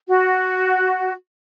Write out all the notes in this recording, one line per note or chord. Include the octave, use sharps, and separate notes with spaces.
F#4